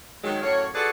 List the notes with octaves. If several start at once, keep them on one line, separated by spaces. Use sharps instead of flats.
D#3 F#3 G#3
F#2 A2 A#3 C#5
F4 F#4 G#4 A4 B4 D5